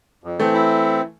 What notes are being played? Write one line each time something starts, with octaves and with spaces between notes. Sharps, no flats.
F2
E3 A3 C4
E4